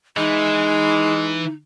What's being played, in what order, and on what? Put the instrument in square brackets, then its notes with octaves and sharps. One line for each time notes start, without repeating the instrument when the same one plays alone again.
[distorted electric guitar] E3 [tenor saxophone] G#3 [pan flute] D#4